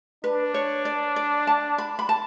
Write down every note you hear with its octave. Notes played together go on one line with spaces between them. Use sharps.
D4 B4
C#5
D5
D5
A5
B5
B5
A5